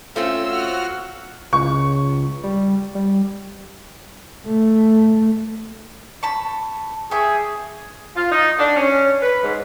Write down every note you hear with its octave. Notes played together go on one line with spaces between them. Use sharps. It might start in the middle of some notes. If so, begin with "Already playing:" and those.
A3 C4 C#4 F4 E6
F#4 F#5 F6
C#2 C#6
G3
G3
A3
A5 B5 C#6
G4 G#4 E5 C#6
F4
D#4
D4
C#4
B4
G#2